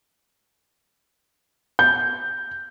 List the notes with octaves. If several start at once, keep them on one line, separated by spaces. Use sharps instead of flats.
G6